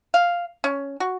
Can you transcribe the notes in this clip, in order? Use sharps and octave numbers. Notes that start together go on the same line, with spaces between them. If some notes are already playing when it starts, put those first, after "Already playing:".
F5
C#4
F#4